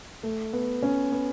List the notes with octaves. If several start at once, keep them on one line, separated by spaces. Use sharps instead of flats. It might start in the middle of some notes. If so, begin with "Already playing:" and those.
A3
B3
C#4
B3